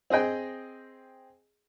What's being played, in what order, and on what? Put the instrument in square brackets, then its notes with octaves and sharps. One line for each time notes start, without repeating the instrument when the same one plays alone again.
[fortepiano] C4 G#4 D#5 G5 G#5